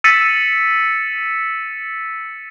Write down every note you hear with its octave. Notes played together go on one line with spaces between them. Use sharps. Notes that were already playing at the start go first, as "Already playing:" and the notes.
E6 A6 B6 C#7 D#7 E7